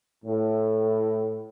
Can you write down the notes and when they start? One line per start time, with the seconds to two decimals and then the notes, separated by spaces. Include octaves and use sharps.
0.25 A2